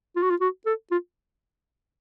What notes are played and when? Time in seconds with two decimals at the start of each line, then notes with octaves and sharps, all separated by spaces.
0.16 F4
0.23 F#4
0.30 F4
0.41 F#4
0.66 A4
0.91 F4